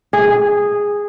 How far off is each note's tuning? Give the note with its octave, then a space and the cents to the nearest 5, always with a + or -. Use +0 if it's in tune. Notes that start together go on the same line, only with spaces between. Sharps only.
G#4 -10